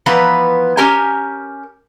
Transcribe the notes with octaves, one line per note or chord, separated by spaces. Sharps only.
E3 F3 B3 B4 A#5
C#4 G4 A#4 G#5 A#5